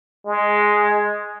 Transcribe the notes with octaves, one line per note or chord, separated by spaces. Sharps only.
G#3